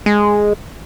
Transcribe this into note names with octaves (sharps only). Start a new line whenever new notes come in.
G#3